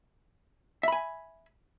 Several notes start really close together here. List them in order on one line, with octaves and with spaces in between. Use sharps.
E5 B5 G#5